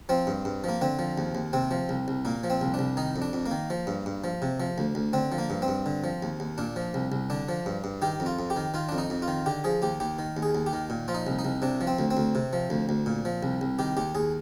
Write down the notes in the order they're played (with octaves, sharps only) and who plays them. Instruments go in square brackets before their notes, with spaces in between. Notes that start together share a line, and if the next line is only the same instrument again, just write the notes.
[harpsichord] F3 C4
G2
G2
F3 A#3
D3 C4
F3
D#2
D#2
C3 C4
F3
C2
C2
A#2 A#3
F3
C4
C2
D4
C2
D#3 D#4
F2
D4
F2
A#3
D#3
F3
G2
G2
F3
C3
F3
D2
D2
D3 C4
F3
A#3
G2
C4
G2
D3
F3
D#2
D#2
A#2 D4
F3
C2
C2
D3 D4
F3
G2
G2
D#3 G4
F2
F4
F2
G4
D#3
D#3 F4
F2 D4
D#4
F2
F4
D#3
D3 G4
F3 G#4
D#2 G4
D#2 G4
D#3
D#2
G#4
D#2
G4
D#3
A#2
F3 F4
D#4
C2
D#4
C2
C3 D4
F3
C4
D2
C4
D2
C3
F3
D2
D2
A#2
F3
C2
C2
D#3 G4
D#2 G4
D#2 G#4